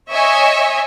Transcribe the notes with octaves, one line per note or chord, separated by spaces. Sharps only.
C#5 D#5 E5 G#5 C#6